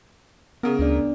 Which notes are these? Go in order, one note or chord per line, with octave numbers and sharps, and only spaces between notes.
C#3 B3 A#4
D2 B3 D4 D5